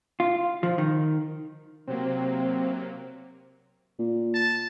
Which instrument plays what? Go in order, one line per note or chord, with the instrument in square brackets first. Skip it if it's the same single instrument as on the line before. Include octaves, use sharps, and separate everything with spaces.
[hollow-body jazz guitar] F4
F3
D#3
[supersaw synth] C3 F#3 A#3 [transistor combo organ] C4
[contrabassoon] A#2
[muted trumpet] A5